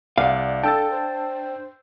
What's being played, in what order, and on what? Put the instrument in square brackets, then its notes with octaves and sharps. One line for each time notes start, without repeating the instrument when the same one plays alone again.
[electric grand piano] C2 D5 F#5 [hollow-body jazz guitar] F5
[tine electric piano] D4 G5 [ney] A4 [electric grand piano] A5 E6 A6
[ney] C5